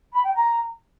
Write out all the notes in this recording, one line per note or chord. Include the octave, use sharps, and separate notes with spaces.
B5
G5
A#5